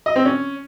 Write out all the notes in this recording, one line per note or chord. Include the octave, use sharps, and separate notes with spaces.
D#5
C4
C#4